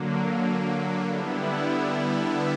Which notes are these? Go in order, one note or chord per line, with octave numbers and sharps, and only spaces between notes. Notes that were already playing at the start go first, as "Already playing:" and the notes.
Already playing: D3 F#3 A#3
D3 G3 B3 E4